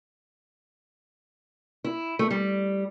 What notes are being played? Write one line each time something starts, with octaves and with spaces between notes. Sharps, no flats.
E4
A3
G3